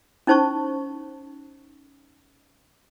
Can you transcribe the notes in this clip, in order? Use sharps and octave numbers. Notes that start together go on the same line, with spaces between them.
C#4 D#4 C5 A5 C#6